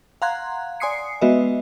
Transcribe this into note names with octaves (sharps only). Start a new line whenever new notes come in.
F5 F#5 A#5 C6 F#6 G#6
D5 G#5 C6 D#6 C7 C#7
G#3 B3 F#4 B4 D#5 E5